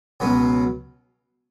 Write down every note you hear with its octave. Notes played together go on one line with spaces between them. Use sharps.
C#2 B2 F#3 B3